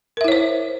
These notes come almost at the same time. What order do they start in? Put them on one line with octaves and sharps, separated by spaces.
A#4 E5 E4 C#5 C5